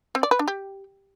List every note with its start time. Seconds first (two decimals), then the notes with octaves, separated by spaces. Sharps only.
0.15 C4
0.23 D5
0.31 B4
0.39 D4
0.48 G4